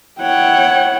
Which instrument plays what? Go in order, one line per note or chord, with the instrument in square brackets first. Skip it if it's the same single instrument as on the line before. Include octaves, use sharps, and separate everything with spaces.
[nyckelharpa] E4 F#5 [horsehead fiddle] C#5 G5